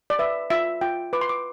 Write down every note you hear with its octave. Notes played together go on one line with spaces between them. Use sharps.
D5
B4 E5
F4 E5
F4 G5
B4 D6
C6
D6